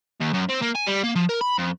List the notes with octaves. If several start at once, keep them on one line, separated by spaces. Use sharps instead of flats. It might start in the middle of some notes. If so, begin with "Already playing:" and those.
D#2
F#2
C4
A#3
G#5
G3
A#3
F3
A#4
B5
F2